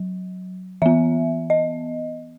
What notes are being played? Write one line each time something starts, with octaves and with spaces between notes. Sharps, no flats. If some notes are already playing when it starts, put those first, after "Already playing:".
Already playing: F#3
E3 B3 E5
D#5